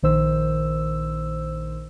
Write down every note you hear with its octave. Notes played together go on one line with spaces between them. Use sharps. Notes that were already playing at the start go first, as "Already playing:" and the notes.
A#1 D#3 C5 E6